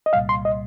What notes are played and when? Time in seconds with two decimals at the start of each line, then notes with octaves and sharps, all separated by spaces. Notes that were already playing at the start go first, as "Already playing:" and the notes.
0.06 D#5
0.13 C2 A#2 G3 F5
0.29 C6
0.45 D#5